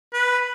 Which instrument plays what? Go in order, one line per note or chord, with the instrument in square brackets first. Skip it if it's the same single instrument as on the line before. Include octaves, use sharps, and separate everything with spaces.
[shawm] B4